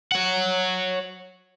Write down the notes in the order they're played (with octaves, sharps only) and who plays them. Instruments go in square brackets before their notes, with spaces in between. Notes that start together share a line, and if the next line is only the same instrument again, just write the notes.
[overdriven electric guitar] C#5 F#5